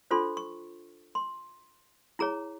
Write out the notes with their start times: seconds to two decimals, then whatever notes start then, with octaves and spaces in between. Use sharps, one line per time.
0.11 D4 F4 A4 C5 C6
0.37 C#6
1.15 C6
2.19 E4 G#4 C#5 A#5